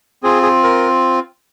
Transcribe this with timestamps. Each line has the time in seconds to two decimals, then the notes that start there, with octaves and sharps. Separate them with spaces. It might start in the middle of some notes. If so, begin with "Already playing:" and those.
0.23 C4 F4 G#4
0.43 G#4
0.63 A#4